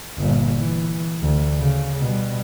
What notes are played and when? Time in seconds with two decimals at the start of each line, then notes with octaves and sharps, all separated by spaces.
0.18 G1 A#2
0.57 E3
1.22 D2
1.58 C#3
1.99 B2 G3